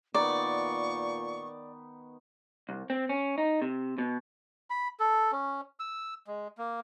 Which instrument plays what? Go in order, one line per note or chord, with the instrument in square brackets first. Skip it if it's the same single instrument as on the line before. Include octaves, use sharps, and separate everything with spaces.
[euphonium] A#2 [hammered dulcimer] D#3 B3 [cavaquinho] D5 [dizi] C#6
[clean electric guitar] C2
C4
C#4
D#4
C3
B2
[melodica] B5
A4
C#4
E6
G#3
A#3